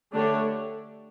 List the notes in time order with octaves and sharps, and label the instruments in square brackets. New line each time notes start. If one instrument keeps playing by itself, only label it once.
[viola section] D3 A3 D4 G4 C#5